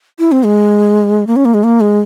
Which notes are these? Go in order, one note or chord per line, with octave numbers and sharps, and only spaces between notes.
E4
C4
G#3
A#3
C#4
A#3
G#3
A#3
G#3